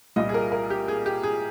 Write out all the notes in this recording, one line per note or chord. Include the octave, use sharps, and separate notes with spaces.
C2 A#2 G3 D#5
G#4
A#4
A#4
G4
G#4
G4
G#4